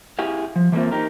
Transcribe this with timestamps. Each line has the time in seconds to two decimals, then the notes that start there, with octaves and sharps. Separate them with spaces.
0.19 E4 G4 G#4 F5
0.56 F3
0.72 E3 A3 A#3 C4 F4
0.91 D#4 G4 A#4